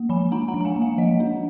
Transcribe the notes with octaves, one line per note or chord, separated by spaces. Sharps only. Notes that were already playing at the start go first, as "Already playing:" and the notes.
Already playing: A#3
F3 G#5 B5
D4 F#5 A#5
F#5 A#5
F3
A#5
F5 G#5
A#3
F5 G#5
F3 D#5 F#5
D4